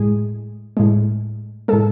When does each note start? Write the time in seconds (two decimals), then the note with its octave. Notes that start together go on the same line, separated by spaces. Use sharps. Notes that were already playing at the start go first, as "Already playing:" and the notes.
Already playing: A2 G#3 G#4
0.77 A2 G#3
1.68 A2 G#3 A4